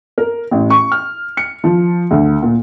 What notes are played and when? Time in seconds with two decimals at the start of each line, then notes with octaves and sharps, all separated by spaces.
0.18 A#4
0.51 A1
0.70 C#6
0.92 F6
1.37 C#7
1.64 F3
2.11 D2
2.43 A#2